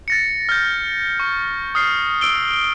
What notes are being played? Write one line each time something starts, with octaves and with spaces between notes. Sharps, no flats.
A6 A#6 C#7
F6 G6
C#6
D#6 F6 C7
E6 D7 G7